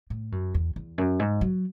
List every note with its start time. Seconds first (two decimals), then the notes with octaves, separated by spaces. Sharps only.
0.10 A2
0.32 F#2
0.54 E2
0.76 E2
0.98 F#2
1.20 G#2
1.41 F#3